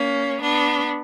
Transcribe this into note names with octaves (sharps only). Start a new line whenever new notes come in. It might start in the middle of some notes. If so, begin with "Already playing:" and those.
Already playing: A#3 C#4
B3 D4